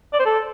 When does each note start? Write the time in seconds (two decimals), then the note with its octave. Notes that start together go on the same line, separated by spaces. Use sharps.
0.13 D5
0.19 C5
0.26 A4